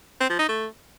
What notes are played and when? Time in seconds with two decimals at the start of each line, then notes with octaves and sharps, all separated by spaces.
0.20 C4
0.30 F3
0.39 D#4
0.48 A3